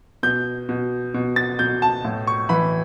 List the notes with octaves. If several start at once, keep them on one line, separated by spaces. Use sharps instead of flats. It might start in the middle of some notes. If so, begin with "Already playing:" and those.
B2 G6
B2
B2
A6
B2 G6
A5
A2
C#6
E3 B5